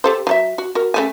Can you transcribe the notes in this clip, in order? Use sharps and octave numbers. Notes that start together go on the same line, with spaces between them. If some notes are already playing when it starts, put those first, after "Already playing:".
G4 A4 C5
F#3 A4 E5
F#4
F#4 A#4
C#3 A3 G#5